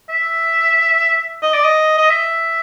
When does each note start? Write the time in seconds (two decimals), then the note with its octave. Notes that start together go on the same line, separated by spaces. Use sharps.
0.09 E5
1.42 D#5
1.54 D5
1.64 D#5
1.98 D#5
2.09 E5